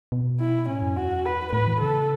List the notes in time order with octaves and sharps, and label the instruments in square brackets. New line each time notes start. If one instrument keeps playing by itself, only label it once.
[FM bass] B2
[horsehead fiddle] E4
[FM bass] A2 [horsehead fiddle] C#4
[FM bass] F#2
[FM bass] E2 [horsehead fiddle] F#4
[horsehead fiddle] B4
[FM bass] A2 [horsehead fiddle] B4
[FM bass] E3
[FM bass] C#3 [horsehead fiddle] A4